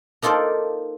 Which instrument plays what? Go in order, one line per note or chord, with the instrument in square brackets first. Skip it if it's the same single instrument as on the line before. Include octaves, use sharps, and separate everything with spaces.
[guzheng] A#3 D#4 F4 A4 C5 D5